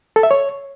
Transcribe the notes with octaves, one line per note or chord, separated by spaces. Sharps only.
A4
E5
C#5